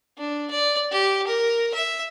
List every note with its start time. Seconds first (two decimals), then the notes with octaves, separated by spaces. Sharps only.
0.18 D4
0.50 D5
0.91 G4
1.27 A#4
1.74 E5